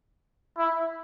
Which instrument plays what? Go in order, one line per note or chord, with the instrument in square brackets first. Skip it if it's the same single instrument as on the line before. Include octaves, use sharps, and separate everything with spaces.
[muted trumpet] E4